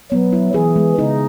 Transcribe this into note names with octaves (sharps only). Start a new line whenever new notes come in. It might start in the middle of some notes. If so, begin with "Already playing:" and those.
F#3 B3
E4
E3 G#4
G#3
C#3 D#4